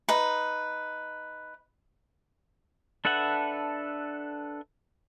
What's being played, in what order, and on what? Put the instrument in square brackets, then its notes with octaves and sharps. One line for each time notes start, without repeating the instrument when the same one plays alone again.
[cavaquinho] D#4 B4
[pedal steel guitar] D4 A4 B4 E5 F#5